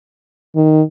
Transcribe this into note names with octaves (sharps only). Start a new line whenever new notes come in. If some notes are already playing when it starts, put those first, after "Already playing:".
D#3